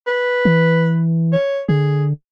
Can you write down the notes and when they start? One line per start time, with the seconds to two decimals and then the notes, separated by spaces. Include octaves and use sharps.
0.07 B4
0.45 E3
1.33 C#5
1.69 D3 G#4